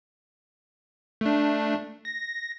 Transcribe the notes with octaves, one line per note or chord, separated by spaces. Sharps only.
A3 D4
A#6